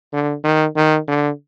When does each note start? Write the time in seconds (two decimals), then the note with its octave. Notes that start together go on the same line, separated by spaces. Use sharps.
0.13 D3
0.44 D#3
0.76 D#3
1.08 D3